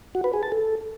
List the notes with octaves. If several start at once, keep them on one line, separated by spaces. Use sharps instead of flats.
F#4
B4
G#4
A5
A4